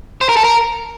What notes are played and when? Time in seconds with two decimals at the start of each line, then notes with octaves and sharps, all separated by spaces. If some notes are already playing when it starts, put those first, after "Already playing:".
0.21 C5
0.29 A#4
0.37 A4
0.44 A#4